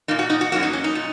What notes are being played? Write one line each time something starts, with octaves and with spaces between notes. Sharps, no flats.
A#2 A#3 D#4
F#4
D#4
F#4
F#2 F#3 A#3 F#4
D#4
C#4
D#4
A#2